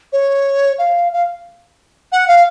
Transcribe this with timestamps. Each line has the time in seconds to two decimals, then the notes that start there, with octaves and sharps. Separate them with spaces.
0.12 C#5
0.78 F5
1.12 F5
2.12 F#5
2.27 F5